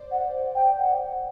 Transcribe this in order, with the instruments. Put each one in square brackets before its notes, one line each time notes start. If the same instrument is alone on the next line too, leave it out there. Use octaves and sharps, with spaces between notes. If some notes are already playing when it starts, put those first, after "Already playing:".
Already playing: [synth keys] C5 D5
[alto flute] F#5
G5
F#5